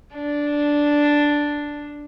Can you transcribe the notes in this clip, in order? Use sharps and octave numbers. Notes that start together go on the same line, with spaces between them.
D4